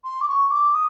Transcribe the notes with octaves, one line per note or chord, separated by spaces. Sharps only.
C6
D6
C#6
D6
D#6